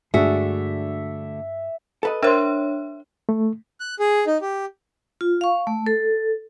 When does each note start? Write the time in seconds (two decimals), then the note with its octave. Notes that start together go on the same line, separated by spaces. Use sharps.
0.14 G2 D3 G#3 A3 D4 F#4 G#4 E5
2.03 A4 B4 D#5
2.23 D4 A#4 C5 C#5 E5 C6
3.29 A3
3.80 F#6
3.99 G#4
4.27 D#4
4.41 G4
5.21 F4
5.41 F5 C#6
5.67 A3
5.86 A4